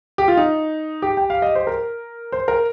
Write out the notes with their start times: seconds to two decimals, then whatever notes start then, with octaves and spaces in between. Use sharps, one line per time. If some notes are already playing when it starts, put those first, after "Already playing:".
0.18 G4
0.28 F4
0.37 D#4
1.02 G4
1.17 G5
1.30 F5
1.42 D#5
1.55 C5
1.67 A#4
2.32 C5
2.48 A#4